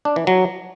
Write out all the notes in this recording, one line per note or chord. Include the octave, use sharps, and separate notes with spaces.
D4
E3
F#3